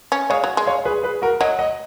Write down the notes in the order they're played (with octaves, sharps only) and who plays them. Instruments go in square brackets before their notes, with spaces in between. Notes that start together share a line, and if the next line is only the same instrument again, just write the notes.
[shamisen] C#4
[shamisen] G#3 [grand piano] C#5 F5
[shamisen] F#3
G#3
[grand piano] C#5 F5
G#4 B4
G#4 B4
F#4 A#4
[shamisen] F#3 [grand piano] D#5 F#5
[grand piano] D#5 F#5